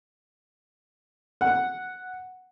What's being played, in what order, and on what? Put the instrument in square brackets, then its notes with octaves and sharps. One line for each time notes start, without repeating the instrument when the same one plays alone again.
[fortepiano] F#5